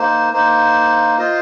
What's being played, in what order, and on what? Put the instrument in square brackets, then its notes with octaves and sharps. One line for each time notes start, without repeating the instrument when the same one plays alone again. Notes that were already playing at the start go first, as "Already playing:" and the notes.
Already playing: [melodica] A#3 D#4 C5
A#3 D#4 C5
F4 C5 D#5